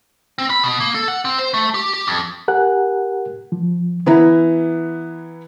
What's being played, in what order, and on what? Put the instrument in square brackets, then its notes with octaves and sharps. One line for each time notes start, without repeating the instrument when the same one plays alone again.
[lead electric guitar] C4
B5
B2
A#3
A4
F#5
C4
C5
A3
G4
G4
F2
[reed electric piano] G4 A#4 F#5 G#5 F#6
F3
[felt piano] E3 B3 E4 A#5